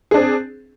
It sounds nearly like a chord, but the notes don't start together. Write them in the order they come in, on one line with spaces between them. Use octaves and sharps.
G#4 D4 C4